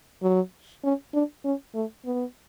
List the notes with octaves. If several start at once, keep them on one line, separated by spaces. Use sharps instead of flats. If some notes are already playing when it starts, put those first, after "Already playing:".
F#3
C#4
D4
C#4
A3
B3